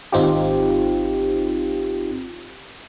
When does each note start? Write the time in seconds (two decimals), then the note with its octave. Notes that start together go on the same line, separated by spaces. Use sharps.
0.12 G#1 C4 D#4 F4 G4